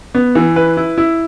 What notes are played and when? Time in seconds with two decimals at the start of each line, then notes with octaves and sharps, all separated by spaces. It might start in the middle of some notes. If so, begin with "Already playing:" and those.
0.15 B3
0.35 E3
0.56 B4
0.77 E4
0.98 E4